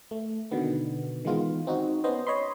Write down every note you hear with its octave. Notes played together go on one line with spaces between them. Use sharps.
A3
B2 D3 D#3 B3
D#3 E3 G#3 B3 F4
C4 D#4 F#4
B3 C#4 C5 D#5
C#5 D#5 B5 C6